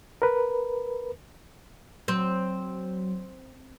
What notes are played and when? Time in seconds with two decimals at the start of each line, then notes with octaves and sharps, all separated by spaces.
0.22 A#4 B4
2.08 F#3 C4